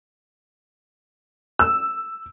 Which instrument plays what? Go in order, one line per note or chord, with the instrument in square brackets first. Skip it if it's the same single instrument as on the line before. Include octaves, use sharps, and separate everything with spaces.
[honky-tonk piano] E6